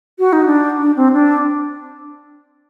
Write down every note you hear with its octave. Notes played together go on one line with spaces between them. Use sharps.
F#4
D#4
D4
D4
C4
D4